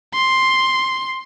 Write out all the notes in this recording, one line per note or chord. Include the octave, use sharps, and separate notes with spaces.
C6